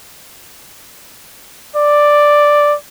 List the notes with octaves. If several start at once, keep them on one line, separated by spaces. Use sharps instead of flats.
D5